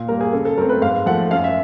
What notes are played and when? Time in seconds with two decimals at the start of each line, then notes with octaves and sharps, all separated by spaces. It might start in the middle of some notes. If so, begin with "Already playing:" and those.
Already playing: A#2
0.08 G3 A#4
0.11 A#3
0.21 G#4
0.33 C#3 A4
0.45 A4
0.57 F#3 A3 C4 A#4
0.69 B4
0.82 G#2 F5
1.06 F3 A3 F#5
1.31 F#2 F5
1.44 E5